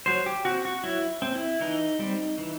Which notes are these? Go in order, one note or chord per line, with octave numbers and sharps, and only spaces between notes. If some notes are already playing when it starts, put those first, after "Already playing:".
F#3 C5
G4
C4 F#4
F#4
F#3 E4
C4
E4
E3 D#4
G3 C4
E3